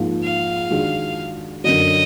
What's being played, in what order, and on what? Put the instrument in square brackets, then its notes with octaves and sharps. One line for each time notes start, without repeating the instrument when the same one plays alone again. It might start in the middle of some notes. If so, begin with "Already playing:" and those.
Already playing: [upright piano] G#2 F3 A#3 F4
[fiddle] F5
[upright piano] D#3 G#3 D4 F#4
[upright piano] F#2 D3 F#3 [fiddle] D#5